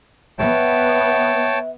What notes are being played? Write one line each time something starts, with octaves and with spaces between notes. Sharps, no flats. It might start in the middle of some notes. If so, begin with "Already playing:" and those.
B3 C#5 E5 G5 A5